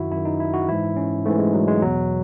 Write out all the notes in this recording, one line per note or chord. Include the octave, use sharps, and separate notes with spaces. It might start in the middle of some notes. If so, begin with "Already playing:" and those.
Already playing: F#2 D#3 E4 F#4
F#2 D#3 E4
D#4
E4
F#4
G#2 E3 E4
C#4
G#2 E3 A3
G#3
F#3
G#3
E2 B2 F#3